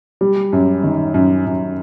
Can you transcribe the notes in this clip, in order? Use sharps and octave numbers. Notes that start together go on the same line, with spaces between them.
G3
F#2
D#3
F#2
F#2